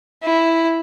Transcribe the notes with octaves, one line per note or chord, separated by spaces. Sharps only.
E4